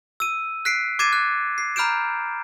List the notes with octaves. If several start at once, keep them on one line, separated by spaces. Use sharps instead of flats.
E6 D#7
F#6 B6 C7 D7
D6 G#6 A6 C7 D#7 E7
F#6
C7
A#5 B5 F6 G6 D7 E7